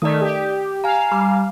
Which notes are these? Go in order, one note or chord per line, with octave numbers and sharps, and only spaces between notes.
D#3 A3 D5 D#6
G4
F5 G#5 A#5
G3